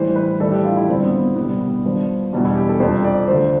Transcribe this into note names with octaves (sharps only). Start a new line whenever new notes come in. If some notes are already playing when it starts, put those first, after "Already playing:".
Already playing: A2 E3 G3 C5
B4
A2 E3 G3 A4
G4
F4
E4
G2 D3 G3 C4
B3
B3
C2 B2 G3 B3
B3
G2 F3
E2 B2 G3 D4
E4
G4
A4
F2 C3 G3 C5
D5
D2 D3 F3 C5